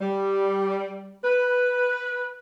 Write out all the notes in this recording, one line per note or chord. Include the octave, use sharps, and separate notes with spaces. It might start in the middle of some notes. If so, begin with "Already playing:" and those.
G3
B4